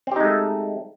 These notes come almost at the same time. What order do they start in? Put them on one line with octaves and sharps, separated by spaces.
C4 G4 D#4 G#3 A3